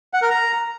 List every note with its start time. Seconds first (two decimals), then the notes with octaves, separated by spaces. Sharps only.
0.14 F#5
0.22 A#4
0.30 A#5